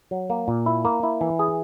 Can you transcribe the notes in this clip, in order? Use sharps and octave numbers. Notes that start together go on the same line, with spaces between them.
F#3
A#3
A#2
E4
A#3
E4
E3
G#4